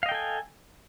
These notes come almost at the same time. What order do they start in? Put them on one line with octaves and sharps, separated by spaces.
F5 D#5 G5 A4 G#5